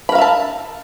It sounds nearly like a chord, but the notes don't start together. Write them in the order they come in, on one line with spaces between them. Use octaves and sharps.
B5 A#4 F5 E5 A5